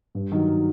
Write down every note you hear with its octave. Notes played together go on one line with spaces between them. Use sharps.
G2
D#3 F#3